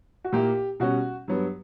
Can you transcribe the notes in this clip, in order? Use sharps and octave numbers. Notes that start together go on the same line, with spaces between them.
F#4
A#2 A#3 E4 G4
B2 G3 C#4 F#4
G2 F#3 B3